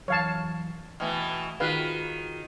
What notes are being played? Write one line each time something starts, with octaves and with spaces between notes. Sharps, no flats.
F2 E3 F#3 C#5 F5 A5
B2 E3 A3 G5 F6
D#3 F4 F#4 G#4 B4 F5